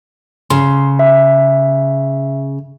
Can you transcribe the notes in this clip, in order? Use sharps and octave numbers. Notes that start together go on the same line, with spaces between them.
C#3 C6
E5